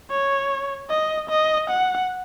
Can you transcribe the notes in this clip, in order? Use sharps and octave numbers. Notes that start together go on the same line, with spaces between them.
C#5
D#5
D#5
F#5